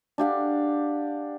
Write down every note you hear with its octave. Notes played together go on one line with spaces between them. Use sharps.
D4 G4 F5 F#5